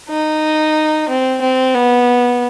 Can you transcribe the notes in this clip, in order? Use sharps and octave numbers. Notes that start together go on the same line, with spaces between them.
D#4
C4
C4
B3